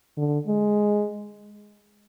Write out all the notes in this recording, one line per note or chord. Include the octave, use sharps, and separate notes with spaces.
D3
G#3